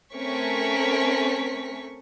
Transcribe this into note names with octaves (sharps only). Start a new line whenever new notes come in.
A3 C4 C#4 A#4 C#6 B6